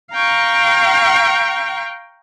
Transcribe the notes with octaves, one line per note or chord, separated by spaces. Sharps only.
F5 G5 A#5 C#6